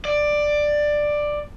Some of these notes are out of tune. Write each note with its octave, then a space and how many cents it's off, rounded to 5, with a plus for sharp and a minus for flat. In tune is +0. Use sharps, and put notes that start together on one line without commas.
D5 +10